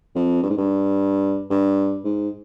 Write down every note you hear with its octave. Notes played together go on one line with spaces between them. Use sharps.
F2
G2
G#2
G2
G2
G#2